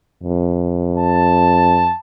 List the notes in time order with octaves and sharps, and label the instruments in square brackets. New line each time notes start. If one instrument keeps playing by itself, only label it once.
[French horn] F2
[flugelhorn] A5